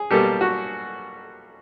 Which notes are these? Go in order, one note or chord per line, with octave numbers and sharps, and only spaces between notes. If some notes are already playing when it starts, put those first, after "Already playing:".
Already playing: G#4
B2 G3 A#3 G4 A4
F#4